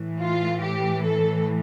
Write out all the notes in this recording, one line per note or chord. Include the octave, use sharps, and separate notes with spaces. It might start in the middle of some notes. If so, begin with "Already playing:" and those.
Already playing: A2 E3
F4
G4
A4